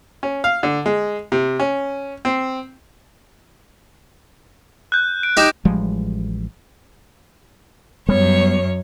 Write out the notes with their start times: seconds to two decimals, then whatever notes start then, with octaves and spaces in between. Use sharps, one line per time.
0.23 C#4
0.44 F5
0.63 D3
0.86 G#3
1.32 C3
1.59 C#4
2.25 C4
4.92 F#6 G6
5.23 D7
5.37 D#4 G4 F#6 E7
5.65 A1 F3 G3 G#3
8.09 F#2 G3 B3 C#5